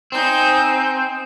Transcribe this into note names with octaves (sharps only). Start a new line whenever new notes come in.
C4 D#4 G#5 G6